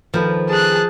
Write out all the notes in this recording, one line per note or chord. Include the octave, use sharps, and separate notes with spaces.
D#3 F3 A4 B4
G#4 A5 F#6